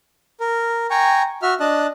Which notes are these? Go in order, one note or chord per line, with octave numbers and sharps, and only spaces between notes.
A#4
G5 G#5 A#5 C#6
F#4 E5 F6
D4 D#5 A5 F#6